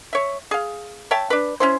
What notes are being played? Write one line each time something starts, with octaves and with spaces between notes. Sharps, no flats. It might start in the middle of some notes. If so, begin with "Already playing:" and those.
C#5 E5
G#4 F5
C#5 E5 G5 A5
D4 B4
C#4 E4 C5